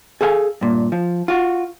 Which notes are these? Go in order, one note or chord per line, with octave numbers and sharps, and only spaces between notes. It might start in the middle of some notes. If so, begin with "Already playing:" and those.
G#4 A4 F5 G5 G#5
G2 A#2
F3
F4 F#4